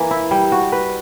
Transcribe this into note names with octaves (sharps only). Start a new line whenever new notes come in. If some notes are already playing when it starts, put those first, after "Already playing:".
Already playing: E3 A#3
E4
G3
F#4
B4